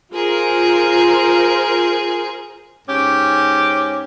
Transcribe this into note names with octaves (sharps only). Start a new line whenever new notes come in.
F4 G#4 A#4 C5
G#2 C#4 G4